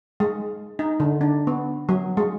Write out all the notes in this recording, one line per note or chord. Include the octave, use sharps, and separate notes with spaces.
G#3
D#4
D3
D4
B3
F#3
G#3